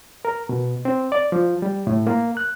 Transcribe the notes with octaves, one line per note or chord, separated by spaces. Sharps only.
A#4
B2
C4
D5
F3
G3
A2
A#3
F#6